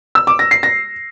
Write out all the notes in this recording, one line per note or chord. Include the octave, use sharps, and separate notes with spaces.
E6
D6
A#6
C7
A#6